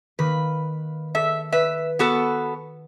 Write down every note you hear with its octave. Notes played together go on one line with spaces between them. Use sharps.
D#3 A#3 B4
A4 E5
B4 E5
B3 F#4 A4